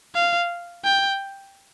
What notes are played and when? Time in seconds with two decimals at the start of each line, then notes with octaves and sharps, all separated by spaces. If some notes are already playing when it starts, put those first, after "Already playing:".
0.14 F5
0.84 G5